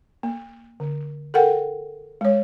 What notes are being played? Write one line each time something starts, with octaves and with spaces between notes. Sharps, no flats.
A#3
D3
A4 A#4 F#5 G5
G#3 C#5